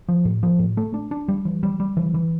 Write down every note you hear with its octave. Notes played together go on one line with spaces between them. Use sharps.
F3
A2
F3
A2
A3
D4
D4
G3
E3
G3
G3
E3
E3